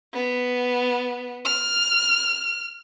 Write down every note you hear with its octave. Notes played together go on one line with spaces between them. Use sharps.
B3
F6